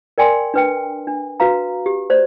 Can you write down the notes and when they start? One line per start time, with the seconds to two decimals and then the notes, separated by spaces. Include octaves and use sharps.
0.18 A#4 D5 G5 G#5 C6
0.54 D4 B4 G5
1.07 D4
1.40 F#4 B4 F5 A#5
1.86 G4
2.10 C5 D5